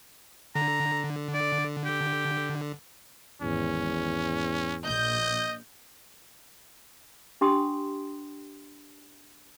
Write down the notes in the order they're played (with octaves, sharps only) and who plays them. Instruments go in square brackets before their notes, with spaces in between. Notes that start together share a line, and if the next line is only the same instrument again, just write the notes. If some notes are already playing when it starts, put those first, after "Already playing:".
[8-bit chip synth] D3 [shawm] A#5
[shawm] D5
G4
[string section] G#1 [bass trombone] E2 [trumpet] C#4
[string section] A#1 G6 [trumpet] D#5
[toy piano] D4 G4 G5 C6 D#6